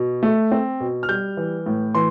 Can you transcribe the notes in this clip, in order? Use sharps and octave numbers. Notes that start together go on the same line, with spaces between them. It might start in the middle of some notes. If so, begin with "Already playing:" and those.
Already playing: B2
A3
C4
B2
F6
G3 G6
E3
A2
E3 C6